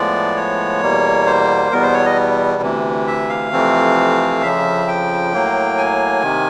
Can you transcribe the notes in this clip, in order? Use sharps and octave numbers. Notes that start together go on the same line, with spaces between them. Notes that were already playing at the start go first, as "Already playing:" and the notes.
Already playing: A2 F3 G#3 B3 D5
C#5
E2 B2 G3 A#3
C5
E2 B2 G3 B3 A#4
C5
C#5
D#5
D2 C3 E3
E5
F5
F2 C3 E3 A3 C4
F2 C#3 F3 E5
G5
A2 F#3 A#3
G#5
C3 D#3